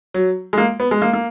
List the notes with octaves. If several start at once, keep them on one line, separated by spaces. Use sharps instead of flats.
F#3
G#3
A#3
B3
G#3
A#3
A#3